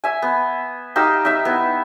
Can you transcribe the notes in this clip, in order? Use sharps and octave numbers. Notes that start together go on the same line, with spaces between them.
E5 G#5
B3
D#4 G4 F5 E6
D#4 E5
B3 E4